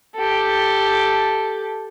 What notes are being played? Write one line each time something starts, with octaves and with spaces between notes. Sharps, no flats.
G4 A4